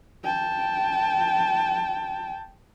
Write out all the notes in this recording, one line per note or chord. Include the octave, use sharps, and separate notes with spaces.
G5 A5